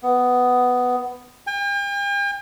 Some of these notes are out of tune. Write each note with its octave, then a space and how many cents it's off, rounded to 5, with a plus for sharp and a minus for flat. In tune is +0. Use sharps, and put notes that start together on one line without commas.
B3 +10
G5 +45